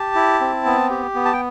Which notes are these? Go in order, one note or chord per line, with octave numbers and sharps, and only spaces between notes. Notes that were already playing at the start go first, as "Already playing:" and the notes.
Already playing: G4 A5
E4
C4
B3
G4
B3
A5
G5